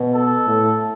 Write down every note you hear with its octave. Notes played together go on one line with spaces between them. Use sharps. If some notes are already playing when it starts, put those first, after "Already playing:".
Already playing: B2
A4
A2